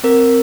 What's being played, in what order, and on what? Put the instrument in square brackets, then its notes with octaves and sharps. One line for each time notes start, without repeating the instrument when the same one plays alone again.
[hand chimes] C4 A#4